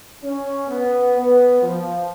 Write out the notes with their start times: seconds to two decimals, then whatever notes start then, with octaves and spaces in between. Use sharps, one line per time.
0.22 C#4
0.68 B3
1.15 B3
1.62 F3